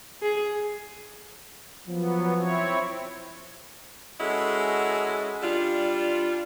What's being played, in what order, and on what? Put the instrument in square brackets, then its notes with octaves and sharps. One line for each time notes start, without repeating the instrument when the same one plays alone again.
[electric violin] G#4
[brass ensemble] F3 [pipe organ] F#3 B3
[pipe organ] C4 E4 C#5
[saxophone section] G#3 C#4 E4 F#4 A4 D#5
G3 D4 F4